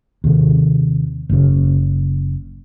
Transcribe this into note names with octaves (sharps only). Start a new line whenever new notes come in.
D#2 C3
F#1 C#3